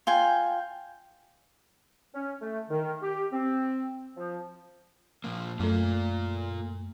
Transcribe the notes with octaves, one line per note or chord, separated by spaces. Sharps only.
F4 G5 G#5
C#4
A3
D#3
G4
C4
F3
A#2 F3 A#3
F#2 A3 A#3 F4